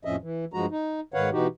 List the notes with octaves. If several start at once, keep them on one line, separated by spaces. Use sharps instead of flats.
F2 A2 F3 C#4 D#5 E5
E3
G2 F3 G#3 F#4 A#5
D#4
G#2 D#3 B4 C#5 F5 F#5
B2 E3 D#4 F#4 G4